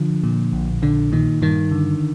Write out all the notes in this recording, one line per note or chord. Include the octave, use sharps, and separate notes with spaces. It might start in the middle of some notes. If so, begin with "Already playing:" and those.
Already playing: D3 F3
A#2
A#1
A#1 D3
A#2 D#3
G2 D#3
D3